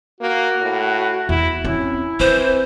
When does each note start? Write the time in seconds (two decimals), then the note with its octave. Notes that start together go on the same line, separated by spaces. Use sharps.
0.21 A#3 F#4
0.61 A2
1.29 E2 E4
1.64 C4 C#4 E4
2.20 E3 C4 C5